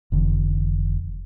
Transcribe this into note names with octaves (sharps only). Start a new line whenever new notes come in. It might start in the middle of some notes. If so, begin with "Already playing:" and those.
F1 D3 E3